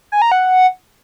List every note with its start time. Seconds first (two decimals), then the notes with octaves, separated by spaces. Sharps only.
0.12 G#5
0.22 A#5
0.32 F#5